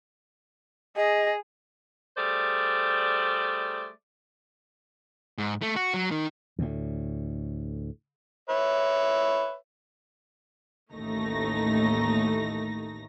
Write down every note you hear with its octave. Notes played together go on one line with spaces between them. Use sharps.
G#4 D#5
G3 A3 G#4 C5 D5
G#2
A3
F#4
F#3
D#3
D2 A2
B4 C#5 E5
A1 D#2 A2 A3 D#4 A#6